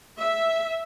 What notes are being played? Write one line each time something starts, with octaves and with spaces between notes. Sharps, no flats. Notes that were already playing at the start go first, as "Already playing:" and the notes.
E5